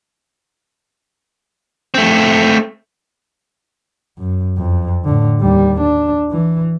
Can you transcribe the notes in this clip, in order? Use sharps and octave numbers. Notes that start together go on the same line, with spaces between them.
A3 C4
F#2
F2
A2 D3
D#2 G3
D4
E3